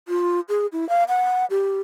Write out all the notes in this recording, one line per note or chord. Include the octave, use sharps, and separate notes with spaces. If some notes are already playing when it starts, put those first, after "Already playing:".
F4
G#4
E4
F5
F#5
G4